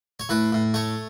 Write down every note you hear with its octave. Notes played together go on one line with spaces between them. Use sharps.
C#5
A2 B4
A2
A3 C#5